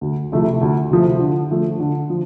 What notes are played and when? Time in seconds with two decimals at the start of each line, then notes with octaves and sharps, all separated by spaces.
0.01 D2
0.32 C3 F3 A3 E4
0.61 D2
0.91 C3 F3 A3 E4
1.20 D3
1.51 F3 A3
1.80 D3
2.10 F3